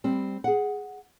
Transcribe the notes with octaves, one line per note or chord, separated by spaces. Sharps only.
G3 C4
G#4 F#5